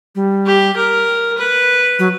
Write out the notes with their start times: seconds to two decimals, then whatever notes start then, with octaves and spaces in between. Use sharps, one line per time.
0.15 G3
0.46 G4
0.77 A#4
1.38 B4
1.99 F#3